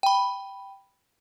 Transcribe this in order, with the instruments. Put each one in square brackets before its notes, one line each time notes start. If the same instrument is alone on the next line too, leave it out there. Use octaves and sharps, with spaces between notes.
[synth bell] G5 B5